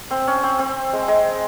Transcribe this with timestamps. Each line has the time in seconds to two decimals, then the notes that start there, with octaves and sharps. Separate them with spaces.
0.11 C4
0.27 C#4
0.43 C4
0.59 C4
0.93 G#3
1.08 G#3